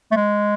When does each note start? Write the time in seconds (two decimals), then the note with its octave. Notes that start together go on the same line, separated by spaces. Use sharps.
0.12 A3
0.17 G#3